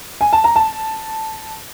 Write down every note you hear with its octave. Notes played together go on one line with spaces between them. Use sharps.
G#5
A5
A#5
A5